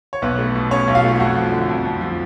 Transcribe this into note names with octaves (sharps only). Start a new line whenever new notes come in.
C#5
B1 B3 B4
A3
B2
C#4 C#5
B1
F4 F5
A3
F2 F#4 F#5
F3
D3
F2
F2
F3